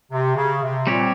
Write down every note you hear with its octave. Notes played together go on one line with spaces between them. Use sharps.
C3
C#3
C3
A#2 G3 C4 G4 C#5